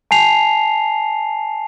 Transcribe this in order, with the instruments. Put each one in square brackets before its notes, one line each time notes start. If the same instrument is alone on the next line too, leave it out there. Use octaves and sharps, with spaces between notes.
[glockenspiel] G#5 A5 C7 F7